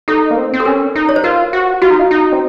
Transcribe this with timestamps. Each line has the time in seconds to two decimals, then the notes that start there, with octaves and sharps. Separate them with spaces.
0.08 D#4 A4
0.31 A#3
0.37 C4
0.54 C4
0.60 A4
0.65 C#4 A#4
0.95 D#4
1.09 C#5
1.16 C5
1.24 F4 A#4
1.53 F#4
1.82 F4 F#4
1.90 D#4
1.99 F4
2.11 D#4
2.32 C4